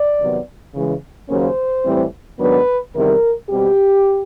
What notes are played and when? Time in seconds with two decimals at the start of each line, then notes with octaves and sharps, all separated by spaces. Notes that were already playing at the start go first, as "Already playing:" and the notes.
Already playing: D5
0.19 C3 D#3 F#3 B3
0.74 C#3 E3 G#3
1.29 D#2 C#3 F#3 A#3 C#4 C5
1.84 A2 E3 G3 C4
2.39 G#2 D#3 F#3 B3 D4 B4
2.94 E2 C3 D#3 G3 A#4
3.49 B2 G3 C4 G4